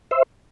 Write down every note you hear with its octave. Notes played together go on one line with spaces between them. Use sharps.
C5 E5